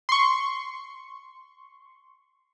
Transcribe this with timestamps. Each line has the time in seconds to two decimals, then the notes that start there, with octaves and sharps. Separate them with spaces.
0.09 C6 C#6